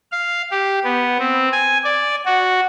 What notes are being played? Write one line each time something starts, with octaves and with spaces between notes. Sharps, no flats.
F5
G4
B3
C4
G#5
D5
F#4